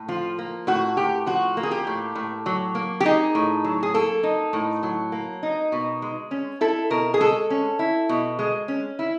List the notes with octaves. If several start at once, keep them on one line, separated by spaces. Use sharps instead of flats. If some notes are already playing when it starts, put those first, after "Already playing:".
Already playing: A2
F3 F4
A#3
A2 F#4
A2 G4
F3 F#4
A#3
G#4
G4
A2
A2
F#3
A#3
G4
D#4 G#4
A2
F#3
G#4
A#3 A4
D#4
A2
F#3
A#3
D#4
B2
G#3
C#4
E4 A4
B2 A#4
G#4
G#3 A4
C#4
E4
B2
G#3
C#4
E4